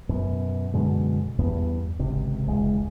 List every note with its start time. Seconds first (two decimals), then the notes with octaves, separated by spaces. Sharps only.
0.09 F#2 B2
0.74 F#2 B2 D3 G#3
1.38 E2 G2 B3
1.99 G#1 C#2 C3
2.48 E1 C#2 G#3